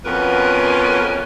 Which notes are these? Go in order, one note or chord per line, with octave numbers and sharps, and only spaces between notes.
F2 B2 B3 C#4 A#4 B4